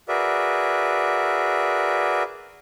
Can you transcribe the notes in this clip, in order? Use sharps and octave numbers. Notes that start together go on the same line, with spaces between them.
F#4 G#4 A#4 B4 D5 E5